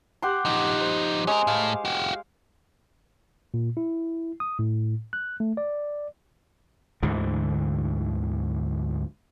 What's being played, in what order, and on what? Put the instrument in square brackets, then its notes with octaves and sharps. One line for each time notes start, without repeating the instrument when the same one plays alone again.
[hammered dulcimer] G4 F#5 C6
[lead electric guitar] F3 D#4
[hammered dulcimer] C5
[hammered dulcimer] G#3 [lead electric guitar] C#4 A#4
[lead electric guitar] A2 [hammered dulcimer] F5
[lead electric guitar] F#4 G4
[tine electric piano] A#2
E4
D#6
A2
F#6
A3
D5
[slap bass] D2 G#2 D3 E3